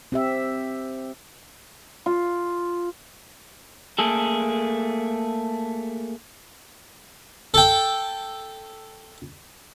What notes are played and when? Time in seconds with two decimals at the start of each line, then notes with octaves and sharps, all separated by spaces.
0.12 C4 G4 E5
2.06 F4
3.99 A3 A#3 G#4 A4
7.54 A4 G5